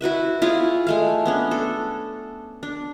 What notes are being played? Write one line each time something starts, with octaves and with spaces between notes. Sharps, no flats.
E4 F#4 B4 E5
E4 F4 G#4 C#5
G#3 A3 F5
B3 C#4 D4
A4
D4